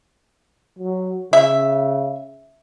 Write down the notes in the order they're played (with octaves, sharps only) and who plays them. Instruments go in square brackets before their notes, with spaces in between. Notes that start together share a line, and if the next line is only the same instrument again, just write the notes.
[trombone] F#3
[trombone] C#3 [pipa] E5